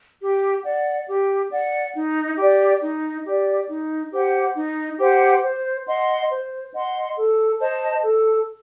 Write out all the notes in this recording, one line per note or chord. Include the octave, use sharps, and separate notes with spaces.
G4
D5 F#5
G4
D5 F#5
D#4
G4 D5
D#4
G4 D5
D#4
G4 C5 F#5
D#4
G4 C5 F#5
C5
D#5 F#5 C6
C5
D#5 F#5 C6
A4
C5 D#5 A5
A4